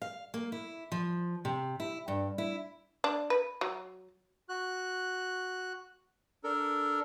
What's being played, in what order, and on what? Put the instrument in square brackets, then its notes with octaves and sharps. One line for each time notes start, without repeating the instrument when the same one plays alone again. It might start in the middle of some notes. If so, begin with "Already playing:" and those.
[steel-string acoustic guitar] F5
A#3
E4
F3
C3
E4
G2
E4
[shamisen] D4
B4
F#3
[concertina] F#4 F#6
D4 A4 A#4